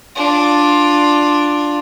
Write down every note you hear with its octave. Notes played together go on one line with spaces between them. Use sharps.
D4 F4